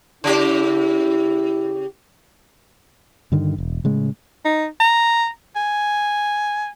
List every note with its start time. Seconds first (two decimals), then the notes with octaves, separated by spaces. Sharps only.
0.24 C#3 E4 G4
3.32 G2 D3 D#3
3.58 E1
3.84 A2 C#3 G#3
4.45 D#4
4.80 A#5
5.56 G#5